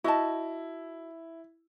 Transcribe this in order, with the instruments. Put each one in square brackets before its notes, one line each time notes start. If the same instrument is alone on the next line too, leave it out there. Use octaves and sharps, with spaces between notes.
[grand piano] E4 [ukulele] F#4 D#5 A5